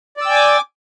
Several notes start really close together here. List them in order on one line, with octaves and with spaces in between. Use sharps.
D5 E6 G5 G#5 D6